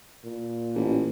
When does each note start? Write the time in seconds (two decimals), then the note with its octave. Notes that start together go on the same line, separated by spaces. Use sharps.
0.24 A#2
0.75 A1